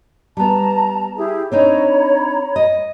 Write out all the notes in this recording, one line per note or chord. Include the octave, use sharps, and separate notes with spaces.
G3 B3 A5 A#5
E4 G4 G#4
C4 D4 D#4 C#5 A#5 B5
D#5